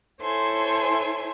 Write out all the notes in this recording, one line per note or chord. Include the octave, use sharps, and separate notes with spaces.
E4 A4 C5 C#5 G#5 C6